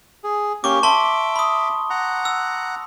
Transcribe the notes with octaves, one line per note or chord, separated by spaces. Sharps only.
G#4
A#3 C#4 G4 C#6 D6
E5 A5 C6 D6 G7
B5 D#6
F#5 A#5
E6